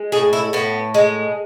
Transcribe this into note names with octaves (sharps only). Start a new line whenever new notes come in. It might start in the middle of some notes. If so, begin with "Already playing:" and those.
Already playing: G#3
A2 G#4
E4
A2 B3
G#3